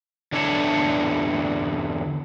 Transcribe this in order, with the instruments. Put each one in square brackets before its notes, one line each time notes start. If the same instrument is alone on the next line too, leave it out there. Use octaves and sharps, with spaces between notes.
[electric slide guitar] E2 D3 D4 E4 C#5 A5